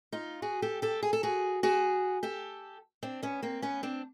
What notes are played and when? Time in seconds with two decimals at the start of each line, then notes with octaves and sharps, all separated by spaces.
0.12 D#4 F4
0.42 F#4 G#4
0.62 G4 A4
0.82 G4 A4
1.03 G#4
1.13 A4
1.23 F#4 G#4
1.63 F#4 G#4
2.23 G4 A4
3.03 C4 D4
3.23 B3 C#4
3.42 A#3 C4
3.62 B3 C#4
3.83 C4 D4